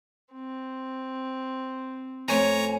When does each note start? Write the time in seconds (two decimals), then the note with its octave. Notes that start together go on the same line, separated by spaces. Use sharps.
0.33 C4
2.28 F2 A3 C#4 C#5 G#5 A#5